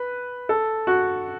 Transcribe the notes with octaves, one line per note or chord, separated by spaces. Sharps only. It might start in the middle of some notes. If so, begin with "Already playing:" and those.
Already playing: B4
A4
F#4